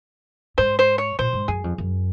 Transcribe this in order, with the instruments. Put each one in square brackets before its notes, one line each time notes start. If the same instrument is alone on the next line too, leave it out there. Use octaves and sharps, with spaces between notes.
[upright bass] G#2 [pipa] C5
[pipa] C5
C#5
[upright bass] A#2 [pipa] C5
[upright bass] G#2
[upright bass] F#2 [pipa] G#4
[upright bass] F2
F#2